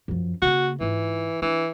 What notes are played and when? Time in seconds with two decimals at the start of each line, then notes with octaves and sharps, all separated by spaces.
0.08 F#2 F3
0.42 C#3 A#3 F#4
0.81 G#2 E3 F4
1.42 E3 D4